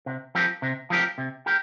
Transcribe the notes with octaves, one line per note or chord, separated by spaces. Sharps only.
C3
F3 C4 G4 A#4
C3
F3 C4 G4 A#4
C3
G4 A#4